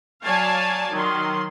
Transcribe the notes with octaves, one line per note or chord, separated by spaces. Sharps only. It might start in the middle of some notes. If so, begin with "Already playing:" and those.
F#3 C#5 D5 F5 G#5 A5
D#3 F#3 C6